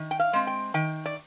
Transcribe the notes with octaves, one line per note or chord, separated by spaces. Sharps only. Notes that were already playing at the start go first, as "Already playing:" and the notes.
Already playing: D#3
G5
F5
G#3 C4
G5
D#3 G5
D5